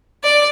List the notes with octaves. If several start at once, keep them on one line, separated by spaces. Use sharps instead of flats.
D5